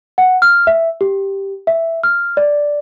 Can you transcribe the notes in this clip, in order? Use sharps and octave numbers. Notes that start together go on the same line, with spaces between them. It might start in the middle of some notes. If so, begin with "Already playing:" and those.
F#5
F6
E5
G4
E5
F6
D5